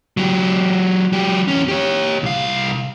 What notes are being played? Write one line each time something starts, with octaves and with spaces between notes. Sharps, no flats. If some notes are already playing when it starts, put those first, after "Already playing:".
F#3 G4
F#3 G4
E2 C#4
G4 C#5
C2 F5